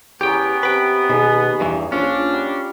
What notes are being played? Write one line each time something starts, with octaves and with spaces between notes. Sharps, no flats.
E2 B3 C#4 G4 A#4 G5
C3 B4 G5
D#2 B2 G#4 E6
E2 G2 E3
A#1 C#4 D4 F4 D6
G3